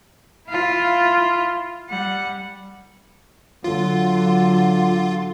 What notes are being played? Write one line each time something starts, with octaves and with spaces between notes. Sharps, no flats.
E4 F4
G3 F#5
D3 F#3 F4